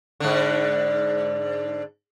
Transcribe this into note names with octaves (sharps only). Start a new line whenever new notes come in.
G#2 D3